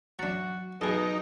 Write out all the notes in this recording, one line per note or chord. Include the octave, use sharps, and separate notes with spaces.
F#3 D4 F#4 A#5 A6
B2 F#3 D#4 G#4 A4